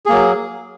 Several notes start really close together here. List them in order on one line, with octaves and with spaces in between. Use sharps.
G#4 A#3 F#3